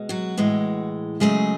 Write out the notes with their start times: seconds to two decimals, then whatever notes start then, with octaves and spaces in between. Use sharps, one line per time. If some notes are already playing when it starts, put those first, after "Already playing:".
Already playing: B2 G#3
0.09 F#3 F#4
0.37 A2 E3 G#3
1.20 C#3 F#3 G#3 A3 G#4